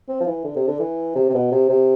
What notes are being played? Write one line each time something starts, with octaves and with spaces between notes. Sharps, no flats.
C4
F3
E3
D3
C3
D3
E3
C3
C3
B2
C3
C3